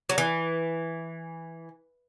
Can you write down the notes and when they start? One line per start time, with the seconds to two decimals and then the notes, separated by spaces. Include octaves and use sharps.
0.09 F#3
0.18 E3